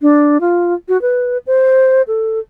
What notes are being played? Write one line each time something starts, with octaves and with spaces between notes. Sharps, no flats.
D4
F4
F#4
B4
C5
A4